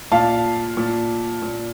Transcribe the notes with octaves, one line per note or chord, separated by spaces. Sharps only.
A#2 F5 A5
A#2
A#2